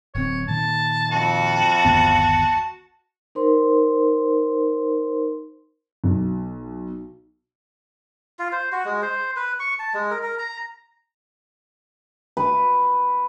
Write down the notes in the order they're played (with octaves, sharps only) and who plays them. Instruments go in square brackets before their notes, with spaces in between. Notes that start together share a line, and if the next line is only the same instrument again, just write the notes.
[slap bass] D1 C4 [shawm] C#5
[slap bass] A#2 D#3 A#3 [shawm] A5
[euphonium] F2 [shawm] F#4 [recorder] A5
[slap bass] G1 D#2 B3
[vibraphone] D#4 A#4 C5 C6
[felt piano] B1
[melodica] F4
C5
F#4
G#3
C5
B4
C#6
A5
G#3
A#4
A#4
A#5
[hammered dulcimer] B4